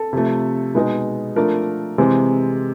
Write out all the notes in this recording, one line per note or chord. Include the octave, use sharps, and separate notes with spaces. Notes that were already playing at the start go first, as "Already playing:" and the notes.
Already playing: A4
C3 F3 A3
B2 G#3 B3 D#4
F3 A3 D4 A#4
C3 E3 G#3 C4